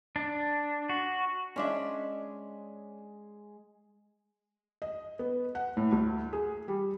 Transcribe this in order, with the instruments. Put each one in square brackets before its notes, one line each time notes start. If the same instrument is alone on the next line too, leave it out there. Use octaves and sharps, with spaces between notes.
[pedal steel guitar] D4
F#4
[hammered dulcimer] G#3 D#5 G#5 [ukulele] C#4 D4 E5
[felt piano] D#5
B3
F#5
A2
D2
G#4
G3